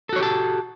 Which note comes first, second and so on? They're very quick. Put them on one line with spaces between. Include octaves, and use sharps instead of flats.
A4 F#4 C#5 G4 A5